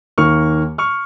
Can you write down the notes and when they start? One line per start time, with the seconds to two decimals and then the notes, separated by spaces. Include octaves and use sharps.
0.18 D#2 D#3 A#3 C#6 F6
0.78 C#6 F6